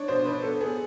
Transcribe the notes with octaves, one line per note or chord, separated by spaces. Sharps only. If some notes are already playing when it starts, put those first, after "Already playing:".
Already playing: D4 C#5
B2 C5
D4 B4
B3 A4
B3 G#4